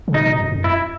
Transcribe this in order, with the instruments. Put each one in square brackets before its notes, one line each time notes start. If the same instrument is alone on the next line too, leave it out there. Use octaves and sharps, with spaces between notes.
[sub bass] C#3
[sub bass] B2 [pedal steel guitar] D#4
[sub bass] A#2
F#2
F#2
[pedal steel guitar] E4